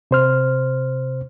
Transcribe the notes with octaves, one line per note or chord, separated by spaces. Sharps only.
C3 C5 F6